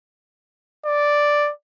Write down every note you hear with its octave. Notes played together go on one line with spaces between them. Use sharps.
D5